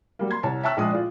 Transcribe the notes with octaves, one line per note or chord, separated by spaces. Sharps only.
F#3 G3 A#3
C6 G#6
C2 C#5 A5
E5 G5 A5 C#6 E6 F#6
A#1 G#3 D#6
F4 D5